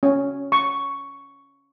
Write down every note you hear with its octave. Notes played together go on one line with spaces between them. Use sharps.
C#4
C#6